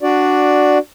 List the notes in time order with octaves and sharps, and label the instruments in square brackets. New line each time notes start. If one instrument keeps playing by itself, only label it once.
[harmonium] D4 F#4 D5